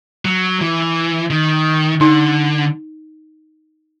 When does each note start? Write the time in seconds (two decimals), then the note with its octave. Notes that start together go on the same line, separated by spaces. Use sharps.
0.25 F#3
0.61 E3
1.30 D#3
2.00 D3 D#4